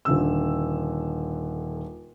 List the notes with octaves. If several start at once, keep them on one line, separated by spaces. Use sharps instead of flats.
D#1 D3 E6